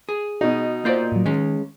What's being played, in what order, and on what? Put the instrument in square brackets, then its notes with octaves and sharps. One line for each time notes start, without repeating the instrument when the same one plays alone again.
[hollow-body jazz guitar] G#4
[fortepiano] B2 D#4 [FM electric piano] F#4
[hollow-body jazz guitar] A#3 F4 D5 [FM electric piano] C5 G6
[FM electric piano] A2 F#3
[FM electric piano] D#3 [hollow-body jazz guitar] G#3 C#4